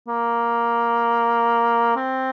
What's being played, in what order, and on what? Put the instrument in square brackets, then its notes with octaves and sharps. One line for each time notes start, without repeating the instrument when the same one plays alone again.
[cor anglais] A#3
C4